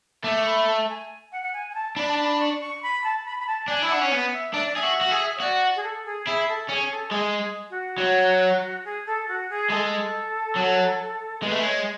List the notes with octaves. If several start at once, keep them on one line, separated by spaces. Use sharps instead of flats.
A3 D6
B5
A5
G#5
F#5
F#5
G#5
G#5
A5
D4 B5
A5
B5
C#6
C#6
B5
A5
B5
B5
A5
D4 G#5
E4
D4 F#5
C#4
B3 F#5
E5
D4 E5
D5
G#4 E5
F#4
F#4
G#4
C#5
F#4 D5
G#4
A4
G#4
E4 G#4
A4
C#4 G#4
A4
G#3 G#4
F#4
F#3
G#4
A4
F#4
G#4
G#3 A4
F#3
G#3 B4
A3
G#3 C#5